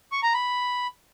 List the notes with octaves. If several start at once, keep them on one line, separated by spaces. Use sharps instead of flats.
C#6
A#5
B5